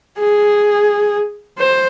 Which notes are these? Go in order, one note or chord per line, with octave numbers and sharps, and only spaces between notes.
G#4
C5